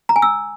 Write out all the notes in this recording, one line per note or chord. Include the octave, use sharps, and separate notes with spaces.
A#5
G#5
E6